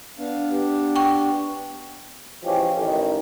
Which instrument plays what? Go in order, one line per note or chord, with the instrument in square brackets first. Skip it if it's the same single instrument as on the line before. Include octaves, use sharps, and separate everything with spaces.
[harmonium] B3 D4 F5
B3 D4 G4
[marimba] G5 C#6
[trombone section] E3 F3 G#3 C#4 G4
A1 D#3